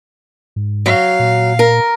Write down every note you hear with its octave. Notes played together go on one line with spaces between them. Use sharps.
G#2
F#3 F5
A#2
A#4